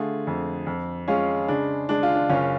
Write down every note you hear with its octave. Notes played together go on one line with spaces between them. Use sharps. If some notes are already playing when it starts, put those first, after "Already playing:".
Already playing: D3 A3 F4 G#4
F2
F2
G#3 C#4 F4
C#3 D4
G#3 D4
F4
D4
F#1 C#4 F4